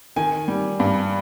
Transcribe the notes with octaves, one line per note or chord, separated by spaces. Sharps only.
D#3 G#5
G3
G2